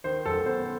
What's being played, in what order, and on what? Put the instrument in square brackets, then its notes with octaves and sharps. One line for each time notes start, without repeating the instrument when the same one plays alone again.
[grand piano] D#3 C5
F#2 A4
B3 C5